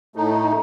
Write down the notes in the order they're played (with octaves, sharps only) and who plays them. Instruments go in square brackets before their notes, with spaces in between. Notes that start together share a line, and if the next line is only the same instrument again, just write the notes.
[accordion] A2 A3 D#4